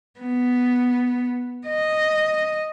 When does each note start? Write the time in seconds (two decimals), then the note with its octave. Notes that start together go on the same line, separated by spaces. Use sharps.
0.20 B3
1.67 D#5